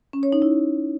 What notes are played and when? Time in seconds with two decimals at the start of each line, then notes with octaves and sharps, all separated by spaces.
0.13 C#4
0.23 C#5
0.32 D#4
0.42 E4